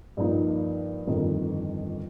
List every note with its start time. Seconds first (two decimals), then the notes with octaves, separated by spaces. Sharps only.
0.17 G2 F3 A#3 D#4
1.07 G1 F2 D#3